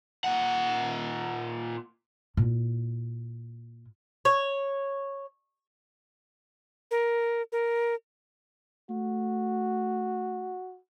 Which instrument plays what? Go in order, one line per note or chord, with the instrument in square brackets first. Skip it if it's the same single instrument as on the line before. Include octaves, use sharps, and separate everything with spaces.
[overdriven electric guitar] A#2 F#5
[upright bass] A#2 E4
[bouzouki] C#5
[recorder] A#4
A#4
[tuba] A3 [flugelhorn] F#4